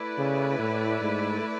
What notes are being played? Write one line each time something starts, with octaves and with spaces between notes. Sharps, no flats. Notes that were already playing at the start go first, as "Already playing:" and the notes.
Already playing: A3 E4 B4 D5
C#3
A2
G#2